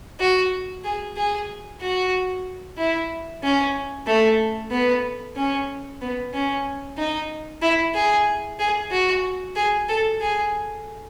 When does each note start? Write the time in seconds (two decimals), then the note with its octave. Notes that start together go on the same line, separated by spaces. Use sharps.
0.20 F#4
0.84 G#4
1.17 G#4
1.81 F#4
2.78 E4
3.43 C#4
4.07 A3
4.71 B3
5.36 C#4
6.01 B3
6.34 C#4
6.98 D#4
7.62 E4
7.94 G#4
8.59 G#4
8.91 F#4
9.56 G#4
9.89 A4
10.21 G#4